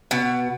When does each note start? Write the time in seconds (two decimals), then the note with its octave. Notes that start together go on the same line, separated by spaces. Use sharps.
0.11 B2